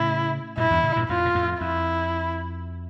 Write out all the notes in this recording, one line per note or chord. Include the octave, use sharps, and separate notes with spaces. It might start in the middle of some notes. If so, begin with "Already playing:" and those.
Already playing: A2 C#3 E4
G2 A#2 E4
E2 G2
A2 C#3
G2 A#2
F2 A2 F4
A#2
F2 A2
F2 E4